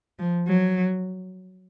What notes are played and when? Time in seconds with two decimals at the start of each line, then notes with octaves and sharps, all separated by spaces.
0.19 F3
0.48 F#3